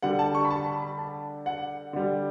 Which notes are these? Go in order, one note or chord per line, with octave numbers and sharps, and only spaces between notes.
D3 G3 F#5
A5
C#6
B5
A5
B5
B5
A5
F#5
D3 G3